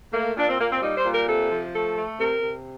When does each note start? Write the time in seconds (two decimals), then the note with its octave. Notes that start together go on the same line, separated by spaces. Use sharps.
0.13 A3 A#3
0.37 A#2 D4
0.48 C4
0.59 A#2 A#3
0.71 C4
0.82 G3 D#4
0.97 C5
1.05 A#2
1.13 A#4
1.28 C3 A4
1.51 F3
1.74 A3 A4
1.96 A3
2.19 C3 A#4
2.42 C3